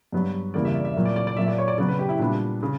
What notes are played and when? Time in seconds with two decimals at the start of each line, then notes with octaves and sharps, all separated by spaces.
0.12 G2 F#3 B3
0.54 E2 C#3 G3 A#3 D5
0.65 E5
0.75 D5
0.85 E5
0.96 A#2 F#3 A#3
1.05 D5
1.16 D5
1.27 D5
1.37 A#2 F#3 A#3 E5
1.48 D5
1.58 C#5
1.68 D5
1.78 C#3 F#3 B3 D5
1.89 B4
1.99 G4
2.09 E4
2.19 A#2 G3 B3 D4
2.63 C#3